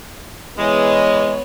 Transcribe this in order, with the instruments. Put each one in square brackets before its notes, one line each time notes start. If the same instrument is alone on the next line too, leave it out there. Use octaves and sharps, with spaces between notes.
[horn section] E3 G#3 [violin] B3 C#5